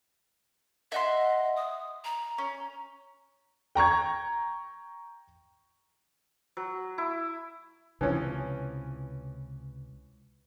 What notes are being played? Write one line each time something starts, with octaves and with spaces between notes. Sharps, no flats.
D#5 E5 F#5 C6
D#6
A#5
C#4
G5 A#5 C#6 G#6
F#3
E4
C#2 C3 E3 F3 C#4